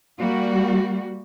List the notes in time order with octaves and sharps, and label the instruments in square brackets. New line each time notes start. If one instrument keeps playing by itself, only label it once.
[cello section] G3 A#3 F#4